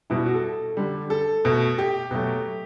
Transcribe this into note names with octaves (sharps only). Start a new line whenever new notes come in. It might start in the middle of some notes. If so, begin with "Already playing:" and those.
B2 G3 E4
F#4
A4
D3 G3
A4
B2 A3
G4
B2 F#3 A3